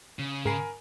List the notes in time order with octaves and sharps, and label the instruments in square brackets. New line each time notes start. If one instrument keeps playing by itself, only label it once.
[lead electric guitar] C#3
[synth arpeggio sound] G#2 C7 D7 [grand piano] A#4 G#5 B5